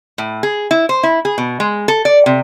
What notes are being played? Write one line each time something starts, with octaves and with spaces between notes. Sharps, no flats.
A2
G#4
E4
C5
E4
G#4
B2
G#3
A4
D5
C3